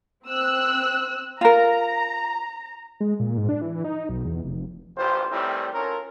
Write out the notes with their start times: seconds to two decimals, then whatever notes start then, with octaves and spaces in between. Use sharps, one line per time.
0.26 C4 E6 F#6
1.41 F4 A#4 A#5
3.00 G#3
3.20 A#2
3.37 G#2
3.49 D4
3.62 E3
3.84 D#4
4.09 B1
4.25 E2
4.44 F1
4.97 A1 F4 G4 C5
5.31 A2 D#3 E3 G3 C4
5.74 C#4 F4 A4 A#4